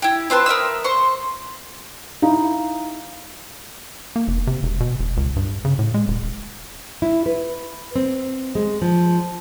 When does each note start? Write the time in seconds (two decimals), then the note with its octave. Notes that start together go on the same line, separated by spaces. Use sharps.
0.02 E4 G4
0.30 C4 F4 B4 A5
0.46 A#4 E5 D#6 E6
0.84 C5 C6 C#6
2.22 D#4 E4 G4 F5 A#5
4.16 A#3
4.28 F1
4.47 C3
4.63 E1
4.80 B2
4.99 E1
5.17 C#2
5.36 G2
5.65 C#3
5.79 A2
5.94 G#3
6.08 D#1
7.02 E4
7.26 B4
7.96 C4
8.55 G#3
8.82 F3